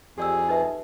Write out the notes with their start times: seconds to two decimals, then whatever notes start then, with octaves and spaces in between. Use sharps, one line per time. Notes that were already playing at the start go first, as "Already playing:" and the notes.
0.18 F2 G4 G#4 D5 E6
0.49 D#4 B4 E5